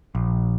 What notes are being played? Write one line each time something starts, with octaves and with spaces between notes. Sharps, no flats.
A#1